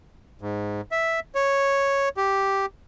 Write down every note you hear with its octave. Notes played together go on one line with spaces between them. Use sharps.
G#2
E5
C#5
G4